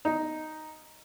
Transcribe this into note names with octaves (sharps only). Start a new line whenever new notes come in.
D#4